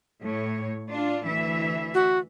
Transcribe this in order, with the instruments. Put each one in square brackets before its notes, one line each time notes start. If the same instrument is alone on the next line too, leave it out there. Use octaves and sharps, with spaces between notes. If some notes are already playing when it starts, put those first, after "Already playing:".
[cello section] A2 C#5
D4 F4
D2 E3 E5
[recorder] F#4